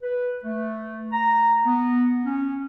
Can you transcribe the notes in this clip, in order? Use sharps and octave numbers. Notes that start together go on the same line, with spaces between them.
B4
A3
A#5
B3
C#4